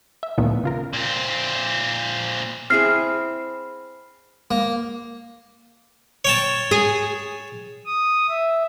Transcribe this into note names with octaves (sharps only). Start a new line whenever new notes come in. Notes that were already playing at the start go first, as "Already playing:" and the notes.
E5
D2 A#2 D#3 F3 A3 B3
C#3 F4 A#4
A#2 C4
C4 E4 G#4 F6 C7
A#3
C#5 G5 A5
G#4
D#6
E5